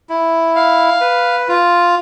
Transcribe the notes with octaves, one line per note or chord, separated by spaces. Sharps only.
E4
F5
B4
F4